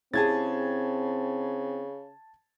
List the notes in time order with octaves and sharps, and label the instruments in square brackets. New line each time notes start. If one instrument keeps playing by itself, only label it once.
[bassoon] C#3 [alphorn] C4 [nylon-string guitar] E4 G4 G#4 [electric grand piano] A5 G#6 A6